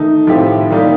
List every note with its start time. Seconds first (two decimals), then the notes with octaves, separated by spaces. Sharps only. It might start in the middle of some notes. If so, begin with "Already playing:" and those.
Already playing: D#3 A3 D#4
0.27 A2 F3 C4 G4
0.70 D#3 G3 A#3 D#4